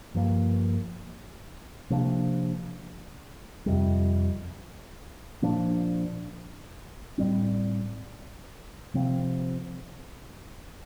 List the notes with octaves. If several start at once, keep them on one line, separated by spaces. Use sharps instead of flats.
G2 F3 A#3
C3 F3 A#3 D4
F2 C3 G3
A#2 F3 A#3 D4
A2 G3 C4
C3 F3 C4